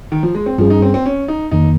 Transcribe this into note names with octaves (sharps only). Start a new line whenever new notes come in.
D#3
F3
G#3
C4
G2 F3 G3 C#4 G#4
D#4
C4
C4
C#4
D#4
F2 D#3 A#3 D#4